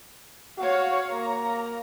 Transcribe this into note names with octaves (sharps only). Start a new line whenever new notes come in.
F#4 C#5 F5
A#3 A#5